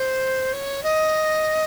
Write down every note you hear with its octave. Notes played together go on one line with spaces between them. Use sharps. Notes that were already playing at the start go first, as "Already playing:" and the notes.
Already playing: C5
C#5
D#5